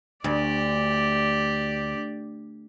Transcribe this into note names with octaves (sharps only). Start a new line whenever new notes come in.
D2 G4 D5